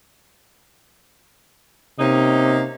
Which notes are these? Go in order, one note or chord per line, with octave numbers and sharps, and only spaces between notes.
C3 A#3 C#4 D#4